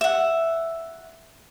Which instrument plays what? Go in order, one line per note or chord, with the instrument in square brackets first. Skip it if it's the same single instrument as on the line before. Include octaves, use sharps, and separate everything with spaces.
[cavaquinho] E5 F#5